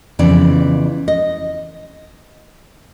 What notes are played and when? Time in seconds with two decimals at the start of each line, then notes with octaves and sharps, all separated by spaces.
0.19 F2 C#3 E3 B3 D5
1.08 D#5